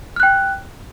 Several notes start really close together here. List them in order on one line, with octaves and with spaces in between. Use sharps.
F6 F#6 G5